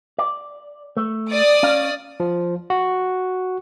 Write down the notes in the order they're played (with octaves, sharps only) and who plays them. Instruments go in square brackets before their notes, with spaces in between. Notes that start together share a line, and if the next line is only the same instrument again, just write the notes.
[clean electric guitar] D5
A3
[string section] D5 D#6
[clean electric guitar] C#4 D#5 F5
[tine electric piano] F3
F#4